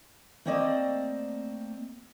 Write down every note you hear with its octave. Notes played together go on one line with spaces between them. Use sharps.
A3 A#3 C4 D5 D#5